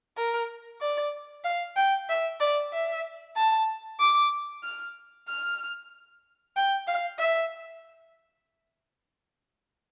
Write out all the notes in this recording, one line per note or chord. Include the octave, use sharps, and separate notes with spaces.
A#4
D5
F5
G5
E5
D5
E5
A5
D6
F6
F6
G5
F5
E5